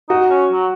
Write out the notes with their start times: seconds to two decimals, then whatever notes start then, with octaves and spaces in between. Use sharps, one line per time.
0.09 D#4 F#4
0.30 C#4
0.52 F#3